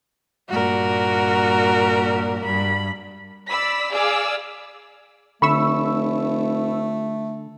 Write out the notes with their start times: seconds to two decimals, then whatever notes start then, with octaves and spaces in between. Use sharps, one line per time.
0.49 G2 A#2 F#4 A#4
2.44 G2 B5
3.48 D5 B5 E6 B6
3.92 G#4 D5 F5 D6 E6
5.42 F1 D3 A3 B5 C#6 E6